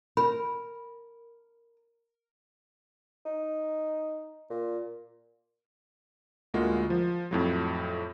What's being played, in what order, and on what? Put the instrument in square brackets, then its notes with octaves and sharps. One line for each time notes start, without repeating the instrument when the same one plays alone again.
[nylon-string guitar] A#4 [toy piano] B5
[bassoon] D#4
A#2
[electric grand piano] D2 A2 G#3 A#3 F4 F#4
F3
F2 A2 F#3